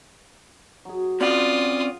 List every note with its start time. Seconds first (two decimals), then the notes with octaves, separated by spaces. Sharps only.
0.85 F#3 G#4
1.21 C4 C#4 F4 D5 F#5 D#6